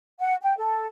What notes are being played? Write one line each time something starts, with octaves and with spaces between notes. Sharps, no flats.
F#5
G5
A4